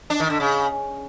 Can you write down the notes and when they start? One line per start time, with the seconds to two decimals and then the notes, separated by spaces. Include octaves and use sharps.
0.10 D4
0.20 D#3
0.30 D3
0.40 C#3